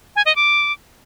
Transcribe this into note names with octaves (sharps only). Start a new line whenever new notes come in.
G#5
D#5
D6